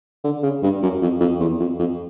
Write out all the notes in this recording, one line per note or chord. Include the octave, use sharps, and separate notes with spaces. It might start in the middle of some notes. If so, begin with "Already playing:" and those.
D3
C#3
G2
F#2
F2
F2
E2
F2
F2